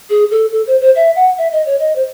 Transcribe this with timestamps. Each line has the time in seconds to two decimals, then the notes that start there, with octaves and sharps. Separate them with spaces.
0.10 G#4
0.31 A4
0.52 A4
0.67 C5
0.80 C5
0.96 E5
1.16 F#5
1.38 E5
1.52 D#5
1.66 C#5
1.80 D#5
1.96 C5